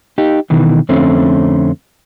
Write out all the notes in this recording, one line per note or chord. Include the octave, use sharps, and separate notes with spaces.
D#4 G4
B2 D#3 E3
F2 D3 A3 C4 C#4